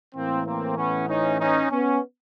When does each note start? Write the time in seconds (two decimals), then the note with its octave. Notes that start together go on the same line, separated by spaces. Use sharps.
0.15 A2 E3 A#3 C4
0.46 A#3 C4
0.77 B3 C#4
1.08 C#4 D#4
1.40 C#4 D#4
1.71 B3 C#4